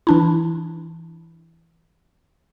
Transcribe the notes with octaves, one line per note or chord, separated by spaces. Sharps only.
E3 D4 E4